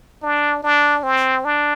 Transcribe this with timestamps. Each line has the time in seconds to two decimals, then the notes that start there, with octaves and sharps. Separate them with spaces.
0.23 D4
0.63 D4
1.03 C4
1.45 D4